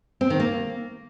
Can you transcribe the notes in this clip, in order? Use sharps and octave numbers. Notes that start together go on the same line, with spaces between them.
C4
D#3
A#3